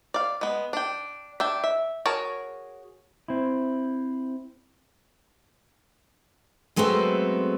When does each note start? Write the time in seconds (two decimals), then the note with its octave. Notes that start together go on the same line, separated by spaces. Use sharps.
0.14 D5 F5
0.41 G#3 B3
0.73 D4 G5
1.40 D4 E5 G5
1.64 E5
2.06 F#4 G#4 A#4 C#5 A5
3.28 C4 E4
6.76 F#3 G#3 A3 B3 C4